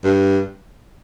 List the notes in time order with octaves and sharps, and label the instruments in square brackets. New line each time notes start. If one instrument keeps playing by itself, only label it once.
[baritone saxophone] G2